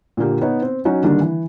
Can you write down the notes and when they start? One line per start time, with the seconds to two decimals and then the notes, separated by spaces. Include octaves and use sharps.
0.17 A#2 D3 A#3 G4
0.41 B3 D#4 C#5
0.62 C4
0.85 F#3 C#4 D#4 F#4
1.03 D3 D#3 G3 A#3 D4
1.21 E3